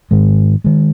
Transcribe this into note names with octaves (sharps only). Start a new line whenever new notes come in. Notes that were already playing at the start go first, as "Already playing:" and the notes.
G#2 D#3 G#3
D#3 G#3